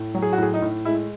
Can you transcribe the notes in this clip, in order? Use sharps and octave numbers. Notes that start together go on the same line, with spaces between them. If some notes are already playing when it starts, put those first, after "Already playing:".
Already playing: A2
F#3
G#4
F#4
A2 G#4
D#4
A2
G#3 E4